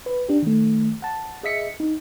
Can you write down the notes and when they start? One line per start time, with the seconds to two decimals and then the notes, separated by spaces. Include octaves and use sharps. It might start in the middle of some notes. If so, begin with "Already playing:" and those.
0.06 B4
0.29 D4 G4
0.43 D#3 A3
1.02 F#5 A5
1.43 G#4 D#5 E5 B6 C#7
1.80 D#4